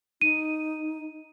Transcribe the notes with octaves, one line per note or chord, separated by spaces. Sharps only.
D#4 D#7